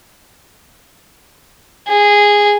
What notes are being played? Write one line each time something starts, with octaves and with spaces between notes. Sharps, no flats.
G#4